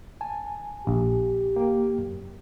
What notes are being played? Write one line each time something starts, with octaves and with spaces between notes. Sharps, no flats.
G#5 A5
A#1 G4
A#3 G5
F#2